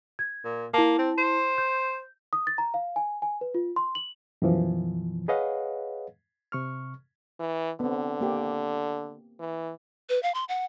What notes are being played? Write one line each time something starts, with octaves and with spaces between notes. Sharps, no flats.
G#6
A#2
A#3 E4 A5
C4
C5
G6
D#6
A6
A#5
F5
G#5
G#5
B4
F4
C6
F#7
F#2 B2 E3 F3
G#4 B4 C#5 D#5 F5 F#5
C3 C#6 F6
E3
D3 B3 C4
A#3 G4
E3
B4
F5
C6
F#5